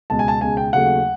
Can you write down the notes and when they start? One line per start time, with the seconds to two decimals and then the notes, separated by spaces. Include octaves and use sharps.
0.10 C#2 B2 G#3 A5
0.19 G#5
0.28 A5
0.41 C#2 B2 G#3 G#5
0.57 G5
0.73 D#2 C#3 F#3 A3 F#5